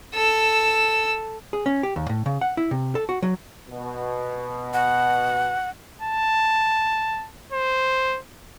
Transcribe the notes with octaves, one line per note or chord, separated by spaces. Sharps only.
A4 E6
G#4
C#4
G4
D#2
A2
C#3
F#5
E4
C3
A4
F#4
F#3
B2
F#5
A5
C5